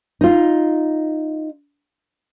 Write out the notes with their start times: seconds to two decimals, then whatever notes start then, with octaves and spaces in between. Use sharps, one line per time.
0.21 D#4 F4